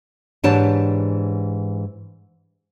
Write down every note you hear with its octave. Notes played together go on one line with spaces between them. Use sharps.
G#2 E3 D4 G4 C#5 A5